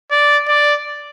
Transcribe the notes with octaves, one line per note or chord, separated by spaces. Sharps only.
D5
D5